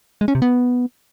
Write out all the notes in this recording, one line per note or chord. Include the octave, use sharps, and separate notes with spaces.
G#3
C#4
C3
B3